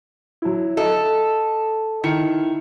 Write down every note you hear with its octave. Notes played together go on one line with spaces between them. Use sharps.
F#3 E4
A4 D#5
D#3 E4 C#7